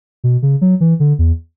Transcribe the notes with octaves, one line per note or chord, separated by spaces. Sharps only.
B2
C#3
F#3
E3
D3
E2